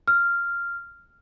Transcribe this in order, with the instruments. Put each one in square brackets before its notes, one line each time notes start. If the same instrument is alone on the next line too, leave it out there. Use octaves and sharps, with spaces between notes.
[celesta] F6